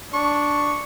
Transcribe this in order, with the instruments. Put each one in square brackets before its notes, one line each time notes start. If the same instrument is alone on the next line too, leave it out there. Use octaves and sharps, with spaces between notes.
[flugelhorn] D4 [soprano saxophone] C#6